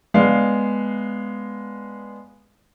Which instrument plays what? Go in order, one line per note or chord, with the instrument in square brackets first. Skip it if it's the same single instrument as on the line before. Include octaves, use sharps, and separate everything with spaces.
[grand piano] G#3 B3 D4 F5